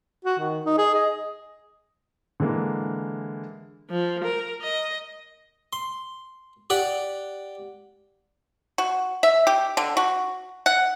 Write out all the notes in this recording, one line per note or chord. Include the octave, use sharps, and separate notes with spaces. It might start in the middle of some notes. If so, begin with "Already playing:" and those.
F#4
D#3
D#4
G#4
D#5
D3 E3 G#3 A#3
F3
A#4
D#5
C6
G4 D5 F#5
F#4
E5
G4
D3
F#4
F#5